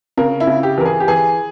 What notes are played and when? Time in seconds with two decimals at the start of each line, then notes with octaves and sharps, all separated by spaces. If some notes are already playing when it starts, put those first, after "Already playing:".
0.17 C#3 A#4
0.40 E4
0.47 C#3
0.63 G4
0.78 E3 A#4
0.85 G#4
1.00 G4
1.08 E3 G#4